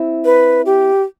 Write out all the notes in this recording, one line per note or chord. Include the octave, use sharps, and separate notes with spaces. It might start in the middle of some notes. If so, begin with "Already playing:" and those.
Already playing: C4 E4
B4
G4